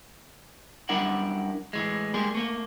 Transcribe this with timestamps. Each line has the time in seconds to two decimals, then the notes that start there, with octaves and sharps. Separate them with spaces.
0.89 F#2 G3 D4 E4 A#4 F#5
1.73 A2 E3 G#3
2.14 G3 G#3 A#3 G#4
2.35 A3 A#3